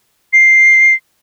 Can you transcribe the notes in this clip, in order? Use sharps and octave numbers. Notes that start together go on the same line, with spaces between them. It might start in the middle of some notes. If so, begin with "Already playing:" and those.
C7